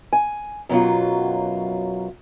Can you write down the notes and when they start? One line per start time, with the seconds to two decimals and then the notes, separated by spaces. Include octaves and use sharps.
0.13 G#5
0.69 F#2 B2 D#3 F#3 F4